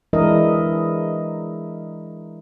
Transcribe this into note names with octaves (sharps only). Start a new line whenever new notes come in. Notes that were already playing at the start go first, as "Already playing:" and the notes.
E3 G#3 D4 E4 A#4 D#5